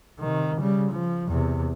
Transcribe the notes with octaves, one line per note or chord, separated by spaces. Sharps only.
C3 D#3
C#3 G3
F3
E2 C3